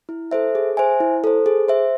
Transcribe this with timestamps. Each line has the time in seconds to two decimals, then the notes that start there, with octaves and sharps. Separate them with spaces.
0.09 E4
0.31 A4 C5 E5
0.55 G#4
0.77 C5 E5 G#5
1.00 E4
1.24 A4 C5
1.46 G#4
1.68 C5 E5